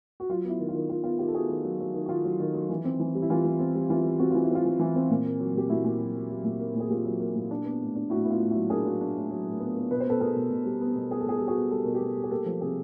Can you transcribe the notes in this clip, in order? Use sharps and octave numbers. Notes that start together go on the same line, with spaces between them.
F#4
F#3 F4
B3 E4
D#3
F4
D#3
D#3 F4
B3 F4
D#3 F4 G4
A4
B3 F#4 G#4
D#3
F#3
F#3
D#3
F#4
D#3 F4
F#3
D#3
F#3
E3
C4
E3
G3
E4
E3 F4
E3
C4
G3
E3 F4
G3
C4 F#4
E3 F4
E4
C4
F4
E3
E3
C4
A#2
A#3
F#3
A#2 G4
A#2 E4 F#4
A#2
F#3
F#3
F#3
A#2
A#3
A#2
G#4
A#2 F4 G4
F#3
A#3
A#2
D4
B3
A2
D4
A2 E4 F#4
B3 E4
F4
A2
E4 F#4
F#3
D4 G#4 A#4
F#3
D4
A2
F#3
A2
B3
B3
B2 B4
C5
B3 A4 B4
B2 G#4 A#4
B2
B2
G3
B3
B2
B3 G#4
A4
B2 G#4
G3 A4
F#4 G#4
B3
G3 A4
B2 A#4
G4 A4
B2
G3
G#4
A#3 G4 A4
F3
C3 G#4 A#4